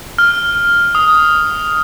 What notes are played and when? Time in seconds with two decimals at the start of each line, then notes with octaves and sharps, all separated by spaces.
0.18 F6
0.95 D#6